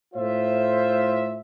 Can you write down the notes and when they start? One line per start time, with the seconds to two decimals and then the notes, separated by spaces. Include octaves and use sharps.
0.14 A2 F4 C5 E5